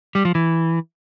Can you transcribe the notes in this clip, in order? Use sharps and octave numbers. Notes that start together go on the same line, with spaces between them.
G3
F3
E3